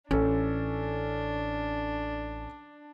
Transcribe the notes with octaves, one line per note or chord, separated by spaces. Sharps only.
A1 C#4 D4 A4